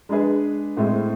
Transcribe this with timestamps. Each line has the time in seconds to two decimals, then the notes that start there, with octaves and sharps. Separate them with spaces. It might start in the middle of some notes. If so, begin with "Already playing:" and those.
0.09 G#3 D4 G#4 B4
0.77 A2 G#3 C4